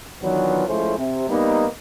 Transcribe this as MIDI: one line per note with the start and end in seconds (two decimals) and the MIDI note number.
0.22 0.67 51
0.22 0.67 52
0.22 0.67 54
0.22 0.67 59
0.22 0.67 62
0.22 0.67 65
0.67 0.95 53
0.67 0.95 56
0.67 0.95 57
0.67 0.95 61
0.67 0.95 64
0.67 0.95 72
0.98 1.26 48
1.29 1.65 55
1.29 1.65 58
1.29 1.65 59
1.29 1.65 63